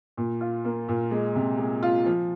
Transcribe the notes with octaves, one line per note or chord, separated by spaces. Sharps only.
A#2
F4
A#3
A#2
G#3
C3
G#3
F4
F3